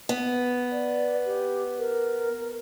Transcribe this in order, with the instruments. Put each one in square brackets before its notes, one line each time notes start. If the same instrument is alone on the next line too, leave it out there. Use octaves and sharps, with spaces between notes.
[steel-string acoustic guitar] B3
[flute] D5
G4
A#4